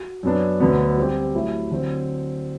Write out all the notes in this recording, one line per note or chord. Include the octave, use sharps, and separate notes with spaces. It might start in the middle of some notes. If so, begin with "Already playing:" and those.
Already playing: F#4
F#2 F#3 B3 D4
D2 D3 F#3 B3
G3 C4 G4
F#3 A3 E4
D3 F#3 C4